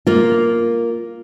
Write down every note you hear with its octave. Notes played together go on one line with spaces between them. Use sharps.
A#3 F4